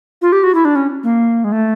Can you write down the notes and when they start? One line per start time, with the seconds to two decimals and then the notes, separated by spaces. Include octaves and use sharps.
0.22 F4
0.32 G4
0.44 F#4
0.55 E4
0.65 D4
0.76 C#4
1.03 A#3
1.44 G#3
1.52 A3